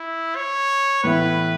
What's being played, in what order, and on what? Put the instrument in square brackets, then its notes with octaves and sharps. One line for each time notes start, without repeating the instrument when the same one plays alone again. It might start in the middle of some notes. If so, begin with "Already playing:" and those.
Already playing: [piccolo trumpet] E4
C#5
[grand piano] A2 E3 B3 E4 [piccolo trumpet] B4